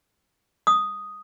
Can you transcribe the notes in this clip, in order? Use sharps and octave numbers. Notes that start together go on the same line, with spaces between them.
D#6